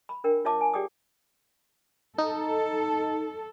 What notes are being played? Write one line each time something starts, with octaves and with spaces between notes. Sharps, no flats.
B5
D4 A#4 G5
F4 C#5 E5 A5 D6
G#5
G4 G#4 D5 G5 D6 D#6
D#4 A4